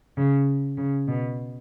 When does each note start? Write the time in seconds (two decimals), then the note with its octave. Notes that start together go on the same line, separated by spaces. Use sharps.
0.17 C#3
0.77 C#3
1.07 B2